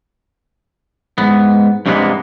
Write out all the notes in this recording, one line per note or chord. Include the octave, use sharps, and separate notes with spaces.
G#2 B3
G2 C3 E3 G#3 A#3 B3